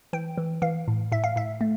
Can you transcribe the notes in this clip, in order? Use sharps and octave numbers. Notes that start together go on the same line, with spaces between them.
E3 G5
E3
E3 F5
A2
A2 E5
F5
A2 E5
A3